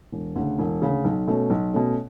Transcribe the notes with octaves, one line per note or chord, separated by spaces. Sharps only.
E1
D2 C#3
E1
D2 C#3
B1
B2 A3 C#4
B1
B2 A3 C#4